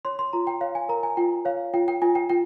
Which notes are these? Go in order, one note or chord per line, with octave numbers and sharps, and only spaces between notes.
C#5 C6
C6
F4 A#5
G5
C#5 F5
G#5
A#4 A#5
G#5
F4 G5
C#5 F5
F4 G5
G5
F4 G#5
G5
F4 G5